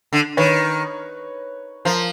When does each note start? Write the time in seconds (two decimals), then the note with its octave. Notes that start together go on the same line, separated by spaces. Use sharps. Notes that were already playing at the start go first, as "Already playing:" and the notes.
0.13 D3
0.37 D#3 B4 C#5
1.85 F3 A#4 C5